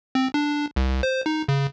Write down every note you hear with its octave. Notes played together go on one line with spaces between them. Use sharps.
C4
D4
C2
C5
D#4
C#3